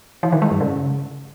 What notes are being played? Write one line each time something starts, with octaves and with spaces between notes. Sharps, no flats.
E3
D#3
G#3
G2
C#3